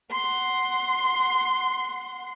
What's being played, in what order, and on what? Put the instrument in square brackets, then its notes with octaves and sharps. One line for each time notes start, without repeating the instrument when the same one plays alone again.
[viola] F#5 C6